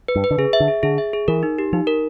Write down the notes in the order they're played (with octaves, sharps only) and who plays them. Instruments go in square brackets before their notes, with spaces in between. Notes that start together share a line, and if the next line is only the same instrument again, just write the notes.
[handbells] B4
[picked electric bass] G2
[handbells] B4
[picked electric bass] D3
[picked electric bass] C#3 [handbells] G#4
[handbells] E5
[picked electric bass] D3
[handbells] G#4
[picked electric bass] D3 [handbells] G#4
[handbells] E5
G#4
[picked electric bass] E3 [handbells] A#4
[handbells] D#4
G4
[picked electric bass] F3 [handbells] D#4
[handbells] A#4